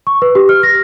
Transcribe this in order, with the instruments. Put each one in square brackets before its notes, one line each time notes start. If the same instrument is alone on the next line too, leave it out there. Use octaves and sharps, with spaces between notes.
[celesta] C#6
B4
G4
F6
A#6